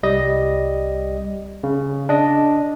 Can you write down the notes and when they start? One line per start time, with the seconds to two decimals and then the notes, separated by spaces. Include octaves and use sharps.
0.03 C2 G3 D#5
1.64 C#3
2.09 D4 D#5